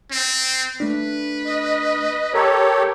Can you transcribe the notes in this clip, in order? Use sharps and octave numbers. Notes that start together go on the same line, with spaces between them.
C4
A3 D4 B4
D#5
G4 A4 A#4 C#5 A#5